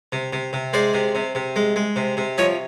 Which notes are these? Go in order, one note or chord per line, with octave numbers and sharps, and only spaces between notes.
C3
C3
C3
G#3 C5 D5
C3
C3
C3
G#3
G#3
C3
C3
F3 C#5 D#5